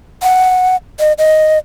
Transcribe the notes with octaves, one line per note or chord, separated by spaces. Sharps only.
F#5
D#5
D#5